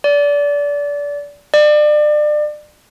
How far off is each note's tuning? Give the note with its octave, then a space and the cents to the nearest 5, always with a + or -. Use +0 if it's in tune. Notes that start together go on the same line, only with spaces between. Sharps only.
D5 -25
D5 +30